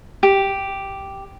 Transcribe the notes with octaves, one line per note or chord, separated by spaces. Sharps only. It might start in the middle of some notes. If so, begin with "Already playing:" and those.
G4